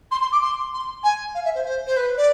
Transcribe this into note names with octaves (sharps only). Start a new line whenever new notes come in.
C6
C6
D6
C6
C6
G#5
F5
E5
C5
C5
C5
B4
D5